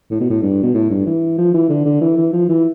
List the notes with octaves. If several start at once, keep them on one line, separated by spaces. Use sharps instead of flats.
A2
B2
A2
G2
B2
A2
G2
E3
F3
E3
D3
D3
E3
E3
F3
E3